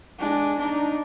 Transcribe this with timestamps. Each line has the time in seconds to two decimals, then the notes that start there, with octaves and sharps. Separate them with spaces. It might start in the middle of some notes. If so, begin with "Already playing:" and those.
0.19 G#3 D4
0.59 D4 D#4